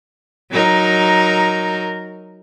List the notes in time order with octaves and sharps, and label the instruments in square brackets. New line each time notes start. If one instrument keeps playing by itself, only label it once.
[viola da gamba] F#3 D#4 A#4